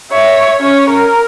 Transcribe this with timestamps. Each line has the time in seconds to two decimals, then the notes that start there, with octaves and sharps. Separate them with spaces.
0.11 C#5 E5
0.58 C#4 C#5
0.89 A#4